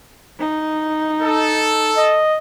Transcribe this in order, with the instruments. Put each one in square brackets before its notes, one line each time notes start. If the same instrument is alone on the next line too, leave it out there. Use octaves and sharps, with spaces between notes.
[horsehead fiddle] D#4
[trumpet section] A4
[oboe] D#5